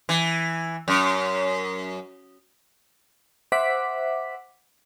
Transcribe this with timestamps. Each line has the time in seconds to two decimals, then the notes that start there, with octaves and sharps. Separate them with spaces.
0.09 E3
0.88 F#2
3.52 C5 E5 F#5 D6 B6